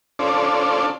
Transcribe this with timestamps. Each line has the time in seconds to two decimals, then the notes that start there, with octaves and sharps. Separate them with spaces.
0.19 C#4 D4 F4 A4 C5 D5